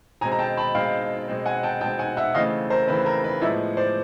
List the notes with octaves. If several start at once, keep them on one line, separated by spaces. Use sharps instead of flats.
B2 G#3 C4 G#5 A#5
A#5
G5 A5
A5 B5
B2 G#3 C4 F5 G5
B2 G#3 C4
F#5 G#5
G5 A5
B2 G#3 C4 G5 A5
F#5 G#5
E5 F#5
C#3 E3 A3 C4 D#5 F5
A#4 C5
C#3 E3 A3 C4 B4
A#4
B4
A2 F3 G#3 B3 D5 E5
C5 D5